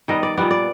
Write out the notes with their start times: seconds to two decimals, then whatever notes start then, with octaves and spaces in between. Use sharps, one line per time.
0.08 D#3 G3 B3 D#5
0.23 D5
0.37 A#2 G3 B3 D5
0.51 D5